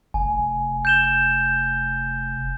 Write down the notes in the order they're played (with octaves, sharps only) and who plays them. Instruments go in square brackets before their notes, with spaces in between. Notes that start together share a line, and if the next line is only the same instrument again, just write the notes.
[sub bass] F1 [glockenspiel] G#5
[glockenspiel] G6 E7 G7